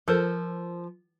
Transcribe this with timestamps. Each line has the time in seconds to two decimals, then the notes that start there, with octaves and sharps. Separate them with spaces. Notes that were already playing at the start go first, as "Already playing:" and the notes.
0.08 F3 A4 A#4 C5